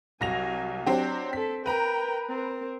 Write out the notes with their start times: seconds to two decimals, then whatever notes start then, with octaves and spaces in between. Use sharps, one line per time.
0.21 C2 F#3 G#5 A#6 F7
0.86 F#3 C4 D4 G4
1.33 C4 A4 B6
1.66 A#4 B4 G5 A#5
2.29 C4 A#4